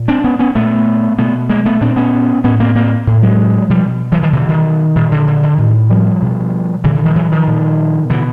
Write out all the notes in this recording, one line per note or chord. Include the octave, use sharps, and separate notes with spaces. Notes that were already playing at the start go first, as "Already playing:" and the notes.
Already playing: A#2
C4 D4
B3 C#4
B3 C#4
A#2 A3 B3
B2 A3 B3
G#3 A#3
A3 B3
A#2 C4 D4
B3 C#4
A2 B3 C#4
A#3 C4
A#3 C4
A2
F#3 G#3
B2 F3 G3
E3 F#3
D#3 F3
B2 D3 E3
D#3
A#2 D#3
D3
D3
D3
A2 D#3
F3 G3
B2
A#2 D3 E3
D3 E3
D#3 F3
E3 F#3
D#3 F3
A#2
B2 D3 E3